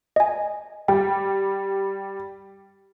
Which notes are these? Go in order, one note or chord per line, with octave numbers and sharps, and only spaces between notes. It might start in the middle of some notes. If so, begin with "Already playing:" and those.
D#5 G#5
G3 G5